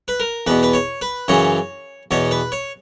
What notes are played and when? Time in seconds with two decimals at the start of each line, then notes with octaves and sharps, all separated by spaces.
0.08 B4
0.20 A#4
0.47 E2 B2 B4
0.63 B4
0.74 C#5
1.01 B4
1.28 F#2 C#3 E3 C#5
2.11 E2 B2 C#5
2.31 B4
2.52 C#5